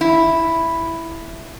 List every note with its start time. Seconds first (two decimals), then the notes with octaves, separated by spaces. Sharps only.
0.01 E4